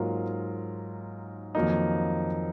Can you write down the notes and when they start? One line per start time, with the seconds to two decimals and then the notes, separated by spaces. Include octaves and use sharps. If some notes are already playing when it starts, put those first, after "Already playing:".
Already playing: G#2 F#3 A#3 F4 A#4
1.55 F2 D#3 F#3 A#3 D#4